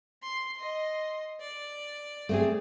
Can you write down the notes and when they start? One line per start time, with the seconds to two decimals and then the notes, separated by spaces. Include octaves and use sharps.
0.23 C6
0.57 D#5 C6
1.41 D5
2.29 A3 C4 G#4